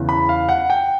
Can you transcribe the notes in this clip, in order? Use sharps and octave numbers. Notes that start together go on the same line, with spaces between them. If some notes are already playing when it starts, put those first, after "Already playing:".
Already playing: E2 C#3 E3
B5
F5
F#5
G5